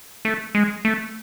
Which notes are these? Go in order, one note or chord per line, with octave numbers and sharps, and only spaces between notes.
A3
G#3
A3